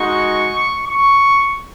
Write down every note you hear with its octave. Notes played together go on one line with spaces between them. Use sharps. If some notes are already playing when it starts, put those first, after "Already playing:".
Already playing: G#3 D#4 F#4 C#6
C#6